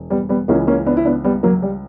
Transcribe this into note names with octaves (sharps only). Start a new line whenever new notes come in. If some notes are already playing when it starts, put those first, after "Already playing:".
Already playing: E1
G3 B3
G3 B3
C#2 C#3 E3 A#3 C#4
A#3 C#4
B3 D4
E4
B3 D4
G3 B3
F#3 A#3
G3